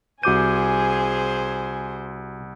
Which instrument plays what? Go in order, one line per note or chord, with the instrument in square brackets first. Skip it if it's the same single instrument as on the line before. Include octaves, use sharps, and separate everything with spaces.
[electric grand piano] C2 D#7 [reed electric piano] F#4 D6 G6 [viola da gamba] G#4 C5 [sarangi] G#5